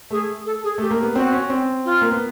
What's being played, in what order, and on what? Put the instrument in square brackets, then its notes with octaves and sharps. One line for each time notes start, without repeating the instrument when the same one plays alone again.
[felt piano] A3 [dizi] G#4
[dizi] A4
G#4
[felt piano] A3 [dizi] G4
[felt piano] A#3
B3
[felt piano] C4 [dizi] F#4
[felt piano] C#4
C4
[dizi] F4
[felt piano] A#3
B3